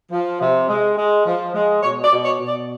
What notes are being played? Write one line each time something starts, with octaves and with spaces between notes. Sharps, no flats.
F3
C3
G#3
G#3
F3
G#3
B2 C#5
D5
B2
C#5
B2
D5